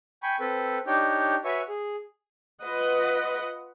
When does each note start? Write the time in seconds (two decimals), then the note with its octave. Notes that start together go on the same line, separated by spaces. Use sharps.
0.23 G5 G#5 B5 C#6
0.40 C4 A4 B4
0.87 D4 D#4 G4 C#5 G5
1.45 F#4 B4 C#5 E5 G#5 C#6
1.68 G#4
2.64 F4 B4 D#5 F#5